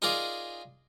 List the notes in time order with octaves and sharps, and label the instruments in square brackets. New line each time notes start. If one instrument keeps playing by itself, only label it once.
[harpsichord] D#4 F4 G#4 A#4 D5